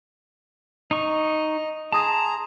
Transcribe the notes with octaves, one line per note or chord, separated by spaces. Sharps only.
D#4 D#5 C#6
G#4 A5 A#5 C6 D#6 A#6